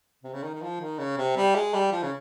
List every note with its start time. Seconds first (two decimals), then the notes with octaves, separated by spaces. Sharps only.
0.23 C3
0.34 C#3
0.43 D#3
0.54 D#3
0.62 F3
0.80 D#3
0.99 C#3
1.18 C3
1.36 G3
1.55 G#3
1.74 G3
1.92 F3
2.03 C#3